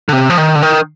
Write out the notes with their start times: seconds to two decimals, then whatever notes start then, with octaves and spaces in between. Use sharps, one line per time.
0.09 D3
0.13 C3
0.30 F3
0.38 D#3
0.55 D3
0.62 D#3